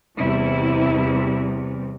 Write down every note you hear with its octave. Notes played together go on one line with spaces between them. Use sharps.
E2 C3 G3 E4